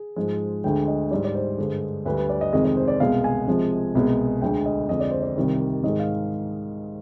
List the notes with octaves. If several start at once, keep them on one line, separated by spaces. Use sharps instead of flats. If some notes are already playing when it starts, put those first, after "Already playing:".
Already playing: G#4
G#2 F3 G#3
D2 D3 G#3 G5
D#5
G#2 G3 D5
D5
C5
G2 D3 G#3
D2 D3 G3 B4
B4
D5
D#5
F2 C3 D#3 G#3 D#5
D#5
C5
D5
C2 B2 G#3 F5
G#5
C2 C3 F3 G#3
C2 B2 G#3
D2 D3 G#3 G5
D#5
F2 D3 G#3 D#5
D5
C5
D5
C2 C3 D#3 G3
G#2 D#3 G#3 D#5
F5